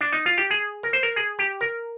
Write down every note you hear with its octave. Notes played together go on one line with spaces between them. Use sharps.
D4
D#4
F4
G4
G#4
A#4
C5
A#4
G#4
G4
A#4